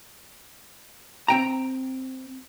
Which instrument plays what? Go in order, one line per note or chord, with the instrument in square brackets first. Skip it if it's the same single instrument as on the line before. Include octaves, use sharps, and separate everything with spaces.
[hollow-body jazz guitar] C4 G5 A#5